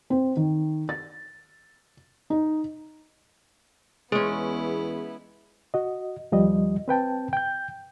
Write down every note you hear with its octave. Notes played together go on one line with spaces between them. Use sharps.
C4
D#3
A6
D#4
E2 G#3 B3 C#4 E4 G#4
F#4 D#5
D#2 F3 G3 D#5
C4 B4 G5 A5
G5 G6